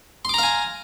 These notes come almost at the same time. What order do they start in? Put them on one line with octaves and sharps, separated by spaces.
C6 D6 A#5 F5 G#5